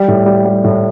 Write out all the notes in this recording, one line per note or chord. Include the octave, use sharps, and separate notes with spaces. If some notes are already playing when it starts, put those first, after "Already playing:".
Already playing: G3
A2
G3
G3
A2